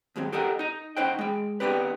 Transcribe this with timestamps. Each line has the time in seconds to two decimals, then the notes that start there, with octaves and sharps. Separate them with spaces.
0.16 D#2 G#2 F#3 C4
0.32 G4 A4 A#4 D#5 F#5
0.59 D#4 D#5
0.97 C#4 D#4 C5 F#5 G5
1.19 G#3 G5
1.60 B3 C4 D4 D#4 G4 B4